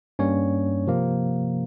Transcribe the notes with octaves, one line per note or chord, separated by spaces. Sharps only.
G2 G3 A#3 C#4 C#5
C3 F3 A#3